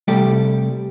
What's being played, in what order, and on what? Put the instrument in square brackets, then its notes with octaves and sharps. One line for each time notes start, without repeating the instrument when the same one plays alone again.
[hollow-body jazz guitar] C2 G3 A3 G4